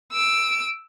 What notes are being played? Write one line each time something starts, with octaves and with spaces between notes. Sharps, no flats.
E6 D7